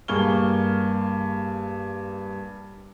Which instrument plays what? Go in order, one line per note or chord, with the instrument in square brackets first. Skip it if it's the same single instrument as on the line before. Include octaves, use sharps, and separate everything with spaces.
[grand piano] G2 A#3 G#4 C#6 F6 G7